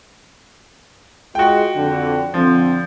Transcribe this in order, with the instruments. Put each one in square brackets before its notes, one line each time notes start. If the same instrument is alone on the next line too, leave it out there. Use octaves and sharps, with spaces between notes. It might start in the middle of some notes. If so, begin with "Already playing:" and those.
[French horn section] G#3 F4 G#4 [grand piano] F#4 G5
[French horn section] F2 D3
[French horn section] F2 D3 C4 [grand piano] F3